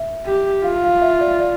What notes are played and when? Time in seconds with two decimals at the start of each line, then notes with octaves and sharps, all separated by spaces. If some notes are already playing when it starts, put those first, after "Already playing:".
Already playing: E5
0.26 G4
0.64 F4 F5
0.84 F5
1.02 E5
1.21 D5
1.40 D5